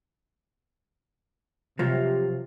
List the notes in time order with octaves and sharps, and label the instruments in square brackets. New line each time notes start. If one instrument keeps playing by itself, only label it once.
[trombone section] C3 [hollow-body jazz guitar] F3 F#3 F4